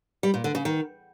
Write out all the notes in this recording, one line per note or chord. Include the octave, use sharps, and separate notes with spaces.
G3
A#2
D3
C#3
D#3